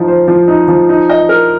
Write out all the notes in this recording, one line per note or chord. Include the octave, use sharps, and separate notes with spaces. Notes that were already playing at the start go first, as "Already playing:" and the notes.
Already playing: F3 D#4
C5
F3
D#4
F3
D#4
D#5
A#4